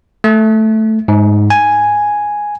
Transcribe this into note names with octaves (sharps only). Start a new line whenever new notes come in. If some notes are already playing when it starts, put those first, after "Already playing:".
A3
G#2
G#5